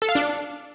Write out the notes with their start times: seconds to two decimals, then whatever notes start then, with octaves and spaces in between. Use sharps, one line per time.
0.02 A4
0.09 F5
0.15 D4